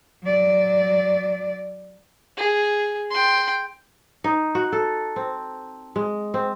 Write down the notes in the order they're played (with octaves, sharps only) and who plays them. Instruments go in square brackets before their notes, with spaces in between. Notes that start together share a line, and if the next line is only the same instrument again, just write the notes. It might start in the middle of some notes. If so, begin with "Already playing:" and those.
[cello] F#3 D5
[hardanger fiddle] G#4
G5 C6
[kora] D#4
F#4
A4
C4
G#3
C4